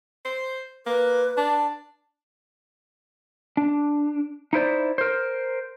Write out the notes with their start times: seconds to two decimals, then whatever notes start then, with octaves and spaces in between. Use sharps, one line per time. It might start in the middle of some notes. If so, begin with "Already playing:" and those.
0.25 C5
0.86 A#3 B4
1.37 D4
3.57 D4
4.53 D#4 E4 C5 D5
4.98 A#4 C5